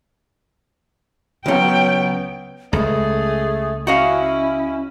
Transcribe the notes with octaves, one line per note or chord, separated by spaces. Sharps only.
C#2 F#3 B3 C#4 G5
C#2 A3 G#4
C#4 E4 F#4 D#5 F5